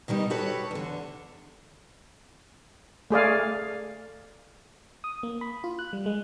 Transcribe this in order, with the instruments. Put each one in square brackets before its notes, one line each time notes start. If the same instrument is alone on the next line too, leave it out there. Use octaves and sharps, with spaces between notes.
[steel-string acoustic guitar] B2 D#3 G3 D#4
F#4 G4 A4 B4 C#5
E2 D3
[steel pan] A3 G#4 D5 F5
[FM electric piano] D#6
A#3
B5
F4
F#6
G3
G#3